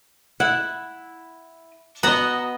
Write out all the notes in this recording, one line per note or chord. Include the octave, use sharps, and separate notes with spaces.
E4 F#5
B3 F#4 D#5 A#5